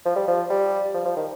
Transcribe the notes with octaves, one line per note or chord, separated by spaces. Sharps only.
F3
G3
F3
G3
F3
F3
D#3